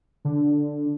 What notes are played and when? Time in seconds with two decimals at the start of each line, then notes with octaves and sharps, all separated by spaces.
0.25 D3